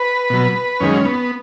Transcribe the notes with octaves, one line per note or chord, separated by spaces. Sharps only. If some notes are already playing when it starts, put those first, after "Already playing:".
Already playing: B4
B2 F#3
F#2 D#3 G#3 C#4
B3